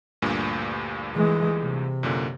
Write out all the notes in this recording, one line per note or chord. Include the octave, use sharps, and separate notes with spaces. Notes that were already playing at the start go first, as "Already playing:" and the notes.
D2 G2 A#2
E3 G#3
C3
F#2 A#2 D3